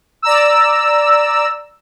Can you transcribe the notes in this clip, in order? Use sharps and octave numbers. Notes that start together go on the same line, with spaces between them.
D5 A#5 E6